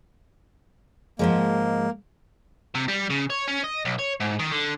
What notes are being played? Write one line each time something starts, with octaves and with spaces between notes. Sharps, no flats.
G#2 F3 G#3 A#3
C3
G3
C#3
C#5
C#4
D#5
B1
C#5
G#2
D#3
D3